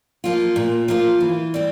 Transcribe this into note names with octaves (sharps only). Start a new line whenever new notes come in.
F3 A#3 F4
A#2
F3 A#3 F4
E3
G3 C4